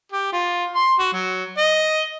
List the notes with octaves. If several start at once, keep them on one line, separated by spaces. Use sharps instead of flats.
G4
F4
C6
F#4
F#3
D#5